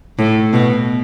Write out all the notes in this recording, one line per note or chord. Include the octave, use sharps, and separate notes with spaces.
A2
B2